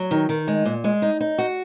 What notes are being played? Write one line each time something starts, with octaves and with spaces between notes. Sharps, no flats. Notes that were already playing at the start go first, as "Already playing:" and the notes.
Already playing: F#3
D#3
D#3
G#3
A#2
G#3
D#4
D#4
F#4